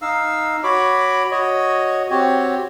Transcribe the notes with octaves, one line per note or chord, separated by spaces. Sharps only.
D#4 F5 E6
F#4 C#5 B5 D6
F#4 C#5 D#5
C4 F#4 G4 C#5